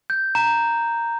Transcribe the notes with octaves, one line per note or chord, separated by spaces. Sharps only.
G6
A#5